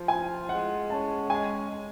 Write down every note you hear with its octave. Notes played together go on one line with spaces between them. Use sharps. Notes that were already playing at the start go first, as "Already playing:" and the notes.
Already playing: F3
F4 G#5
G#3 F#5
C#4 A5
G#3 G#5
G#3